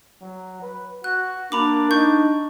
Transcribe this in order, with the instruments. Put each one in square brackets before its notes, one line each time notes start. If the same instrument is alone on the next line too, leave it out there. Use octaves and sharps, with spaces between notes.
[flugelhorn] F#3
B4
[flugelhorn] F#4 [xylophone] F#6
[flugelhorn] A#3 [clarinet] D4 [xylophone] A#5 B5 D6
[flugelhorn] D#4 [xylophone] C#6 G6